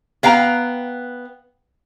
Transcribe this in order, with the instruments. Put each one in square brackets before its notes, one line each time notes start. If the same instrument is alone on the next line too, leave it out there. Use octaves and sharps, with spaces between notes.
[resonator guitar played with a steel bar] B3 F5 G5 A#5